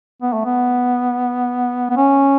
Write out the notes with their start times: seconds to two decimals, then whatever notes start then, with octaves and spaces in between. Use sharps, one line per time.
0.22 B3
0.33 A3
0.45 B3
1.90 B3
1.97 C#4